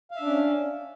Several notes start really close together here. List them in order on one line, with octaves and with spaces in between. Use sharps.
F5 E5 D4 C#4